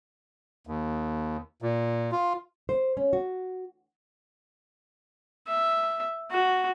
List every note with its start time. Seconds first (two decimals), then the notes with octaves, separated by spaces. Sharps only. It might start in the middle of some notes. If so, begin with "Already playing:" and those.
0.67 D#2
1.62 A#2
2.12 F4
2.69 C5
2.97 C#4
3.13 F#4
5.48 E5
6.31 F#4